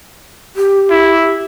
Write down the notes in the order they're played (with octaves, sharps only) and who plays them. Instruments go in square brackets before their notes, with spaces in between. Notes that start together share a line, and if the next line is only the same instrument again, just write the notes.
[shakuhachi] G4
[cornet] E4